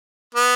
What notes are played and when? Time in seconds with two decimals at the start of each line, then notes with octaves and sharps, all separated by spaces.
0.35 B3